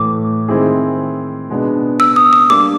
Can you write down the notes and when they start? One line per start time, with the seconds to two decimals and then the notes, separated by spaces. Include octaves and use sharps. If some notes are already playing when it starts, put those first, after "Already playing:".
Already playing: A2 E3 A3 D6
0.48 D#3 G#3 C4 E4 G#4
1.50 B2 G#3 B3 D4
2.00 E6
2.16 D#6
2.33 D#6
2.50 G3 A#3 D4 G4 D6